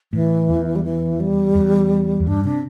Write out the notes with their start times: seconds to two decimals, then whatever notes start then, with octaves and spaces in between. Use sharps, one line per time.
0.13 A2 E3
0.49 E2
0.76 G3
0.84 E3
1.20 G3
1.55 E2
2.20 E2
2.26 G2 D4
2.45 C3 D4